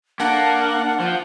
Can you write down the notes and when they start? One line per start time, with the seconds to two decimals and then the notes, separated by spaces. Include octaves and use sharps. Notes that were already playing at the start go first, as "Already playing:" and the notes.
0.20 A#3 D4 F#5 A5
1.00 F3 F4